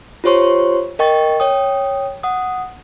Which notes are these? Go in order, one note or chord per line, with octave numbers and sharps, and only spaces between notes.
F4 G4 C5 C#5 C6 C#6
A#4 D#5 G5 C#6 A6
C#5 G5 D#6
F#5 D#6